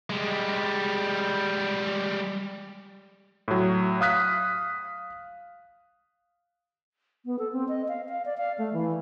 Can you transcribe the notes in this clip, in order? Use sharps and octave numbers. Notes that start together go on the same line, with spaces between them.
G3 G#3
A2 F#3
F5 D#6 F#6 B6
B3
A4
C4
D#5
F5
F5
D5
F5
A3
E3